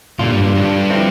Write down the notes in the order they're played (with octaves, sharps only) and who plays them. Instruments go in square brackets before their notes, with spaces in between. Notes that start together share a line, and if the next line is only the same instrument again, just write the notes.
[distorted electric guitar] A#2 [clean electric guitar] D3 G3 D4 F4
[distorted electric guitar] G2
G2
G2
[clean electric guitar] D3 F3 C4 E4